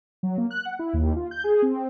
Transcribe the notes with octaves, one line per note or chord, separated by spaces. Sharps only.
F#3
A#3
F#6
F#5
E4
D#2
F4
G6
G#4
C4